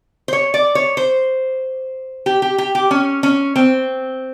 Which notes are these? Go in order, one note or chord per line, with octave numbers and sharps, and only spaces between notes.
C5
C#5
D5
C#5
C5
G4
G4
G4
G4
C#4
C#4
C4